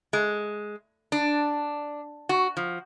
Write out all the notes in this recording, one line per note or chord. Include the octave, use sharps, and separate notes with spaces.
G#3
D4
F#4
F3